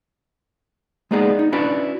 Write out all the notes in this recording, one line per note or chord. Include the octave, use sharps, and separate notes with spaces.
G#3 A#3 B3 D#4 G#4 D5
D#4
C#4 D4 E4 F#4 B4 D5